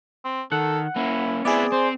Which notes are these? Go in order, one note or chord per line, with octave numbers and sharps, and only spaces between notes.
C4
D#3 A4 F#5
A#3 C#4 E4
B3 C4 E4 G#4 D5
C4 C5